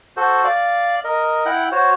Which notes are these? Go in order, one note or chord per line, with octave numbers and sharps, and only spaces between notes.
F#4 A4 C5
D5 F5
A#4 D#5
E4 F#5 G5
F#4 C5 C#5